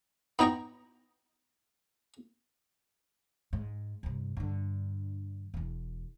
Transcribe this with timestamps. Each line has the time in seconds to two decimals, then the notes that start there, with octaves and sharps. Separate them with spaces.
0.39 B3 D#4 G5 A#5 C#6
3.53 G#2
4.03 G2 C3
4.37 G2 D3
5.54 E1 E2